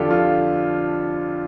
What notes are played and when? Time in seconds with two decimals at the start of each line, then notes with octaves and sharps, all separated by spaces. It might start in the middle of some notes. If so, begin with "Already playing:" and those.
Already playing: F2 D3 D4 F4 G4 A4
0.10 F4 A4